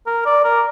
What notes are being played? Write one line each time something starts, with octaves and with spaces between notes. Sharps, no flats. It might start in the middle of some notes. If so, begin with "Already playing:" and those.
A#4
D5
A#4